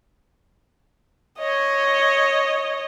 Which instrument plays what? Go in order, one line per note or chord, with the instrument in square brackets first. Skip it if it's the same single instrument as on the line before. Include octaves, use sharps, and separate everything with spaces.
[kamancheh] C#5 D#5